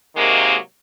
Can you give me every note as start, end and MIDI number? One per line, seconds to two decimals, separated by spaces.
0.16 0.55 48
0.16 0.55 51
0.16 0.55 54
0.16 0.55 56
0.16 0.55 58